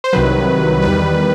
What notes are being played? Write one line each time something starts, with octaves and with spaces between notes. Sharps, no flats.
C5
C2 C3 D#3 F#3 B4
E2 D#3 G3 B4